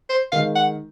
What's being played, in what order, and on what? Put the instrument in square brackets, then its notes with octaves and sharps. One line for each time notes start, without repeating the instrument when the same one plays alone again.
[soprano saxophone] C5
[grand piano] D#3 G#3 [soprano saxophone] F5
[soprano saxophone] F#5